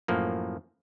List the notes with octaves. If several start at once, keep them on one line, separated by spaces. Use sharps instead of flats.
F#2 A2 F3 A#3